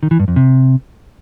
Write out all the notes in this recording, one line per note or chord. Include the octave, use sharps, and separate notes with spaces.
D#3
E3
G2
F2
C3